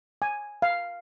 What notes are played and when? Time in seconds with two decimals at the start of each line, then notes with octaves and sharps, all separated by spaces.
0.22 G#5
0.62 F5